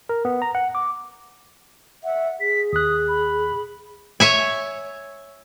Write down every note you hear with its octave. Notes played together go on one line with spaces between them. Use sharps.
A#4
B3
A#5
F#5
D6
E5 F#5
G#4 B6
D#2 D#6 F#6
B5
C#5 E5 G#5